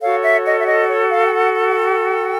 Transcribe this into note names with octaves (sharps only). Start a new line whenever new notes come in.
F#4 A4 C#5 F5
E5
D#5
E5
D#5
C#5
F5
G5
F#5
F#5
F#5
G5